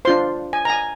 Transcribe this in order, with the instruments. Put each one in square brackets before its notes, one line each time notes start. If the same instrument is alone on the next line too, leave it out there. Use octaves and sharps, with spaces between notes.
[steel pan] D4 F4 C5 C6
G#5
A#5
G#5